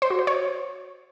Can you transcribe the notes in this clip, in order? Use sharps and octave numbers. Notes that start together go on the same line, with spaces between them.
C5
F#4
C5
C#5